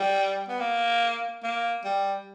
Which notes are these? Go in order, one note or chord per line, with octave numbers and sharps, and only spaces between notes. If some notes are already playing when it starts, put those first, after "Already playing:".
Already playing: G3
B3
A#3
A#3
G3